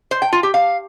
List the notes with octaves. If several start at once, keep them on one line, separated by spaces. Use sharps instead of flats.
C5
G5
F4
G4
F5